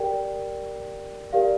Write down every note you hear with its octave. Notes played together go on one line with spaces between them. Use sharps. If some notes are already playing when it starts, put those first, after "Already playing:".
Already playing: G4 A#4 D5 G5
G4 A#4 D5 F5